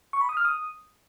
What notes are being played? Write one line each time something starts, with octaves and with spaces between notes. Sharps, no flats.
C#6
B5
D#6
F6
D#6